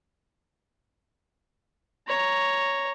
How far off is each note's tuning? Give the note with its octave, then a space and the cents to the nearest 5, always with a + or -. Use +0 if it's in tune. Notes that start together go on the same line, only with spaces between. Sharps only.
C#5 +0 A#5 +0